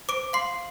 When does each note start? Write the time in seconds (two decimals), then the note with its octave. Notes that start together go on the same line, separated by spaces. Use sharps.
0.09 C5 D6 D7
0.33 F5 C6 C7